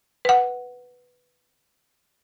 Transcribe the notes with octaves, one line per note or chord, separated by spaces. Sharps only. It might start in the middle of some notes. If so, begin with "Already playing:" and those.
B4 F#5